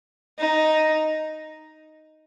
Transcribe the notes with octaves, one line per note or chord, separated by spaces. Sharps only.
D#4